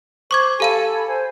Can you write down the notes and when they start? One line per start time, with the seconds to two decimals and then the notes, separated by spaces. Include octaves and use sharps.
0.31 C5 C#6 D6 G#6
0.60 G4 A4 F5 G#5 B5 D#7
1.07 C5 G#5